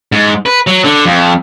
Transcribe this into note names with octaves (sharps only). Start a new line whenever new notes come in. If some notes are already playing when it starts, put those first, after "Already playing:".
G#2
B4
F#3
D3
F2